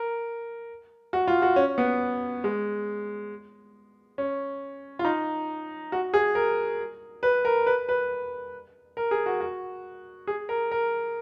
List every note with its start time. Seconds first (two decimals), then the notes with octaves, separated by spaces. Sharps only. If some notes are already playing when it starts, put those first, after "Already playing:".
Already playing: A#4
1.13 F#4
1.28 F4
1.42 F#4
1.56 C#4
1.78 B3
2.44 G#3
4.18 C#4
4.99 F4
5.05 D#4
5.92 F#4
6.14 G#4
6.35 A#4
7.23 B4
7.45 A#4
7.66 B4
7.89 B4
8.97 A#4
9.11 G#4
9.26 F#4
9.41 F#4
10.27 G#4
10.49 A#4
10.71 A#4